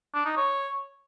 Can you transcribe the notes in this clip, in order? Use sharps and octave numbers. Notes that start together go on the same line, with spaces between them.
D4
D#4
C#5